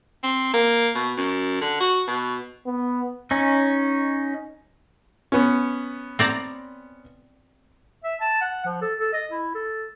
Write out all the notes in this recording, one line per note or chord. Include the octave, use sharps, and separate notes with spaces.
C4
A#3
B2
F#2
D3
F#4
B2
B3
C#4 D#4
B3 C#4
C4 D5 A#5
E5
A5
F#5
F3
A4
A4
D#5
E4
A4